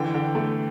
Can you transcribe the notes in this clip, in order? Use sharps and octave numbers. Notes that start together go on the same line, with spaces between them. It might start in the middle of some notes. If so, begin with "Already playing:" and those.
Already playing: D3 E3 G5
D3
A3